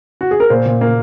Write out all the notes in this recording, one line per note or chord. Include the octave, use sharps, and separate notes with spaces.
F#4
G#4
A#4
A#2 C5
A#2
A#3